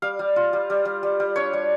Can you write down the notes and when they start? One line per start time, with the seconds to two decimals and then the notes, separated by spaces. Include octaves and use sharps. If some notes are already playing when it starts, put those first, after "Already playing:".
0.02 G3 F5
0.19 G3
0.36 F4
0.53 G3
0.70 G3
0.85 G3
1.03 G3
1.20 G3
1.36 D4 C#5
1.53 G3